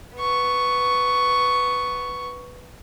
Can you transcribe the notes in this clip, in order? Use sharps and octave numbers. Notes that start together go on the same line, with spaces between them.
B3 C#6